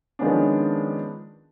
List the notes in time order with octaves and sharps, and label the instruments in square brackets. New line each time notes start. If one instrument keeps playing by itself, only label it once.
[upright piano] D#3 F3 G#3 B3 C#4 D4